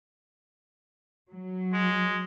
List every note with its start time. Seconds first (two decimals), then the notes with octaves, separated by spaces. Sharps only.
1.30 F#3
1.74 G#3